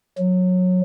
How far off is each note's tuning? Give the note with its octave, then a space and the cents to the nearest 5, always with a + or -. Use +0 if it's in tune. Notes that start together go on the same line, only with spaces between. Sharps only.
F#3 -20